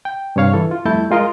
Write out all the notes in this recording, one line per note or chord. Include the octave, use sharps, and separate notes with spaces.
G5
G2 C3 C#5 F5 C#6
E3 A4
F4
F2 G3 A3 E4 A5 G6
G#3 F4 A#4 D#5